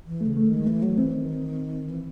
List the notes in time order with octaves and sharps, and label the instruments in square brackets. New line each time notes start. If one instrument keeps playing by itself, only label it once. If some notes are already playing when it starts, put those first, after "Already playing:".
[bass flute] E3
[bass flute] C#3 [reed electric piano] A3
[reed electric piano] A3
[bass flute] D#3
[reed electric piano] G#3
[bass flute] E3 [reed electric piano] A3
[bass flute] F#3
[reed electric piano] A3
[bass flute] E3 [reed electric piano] C4
[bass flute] D#3
E3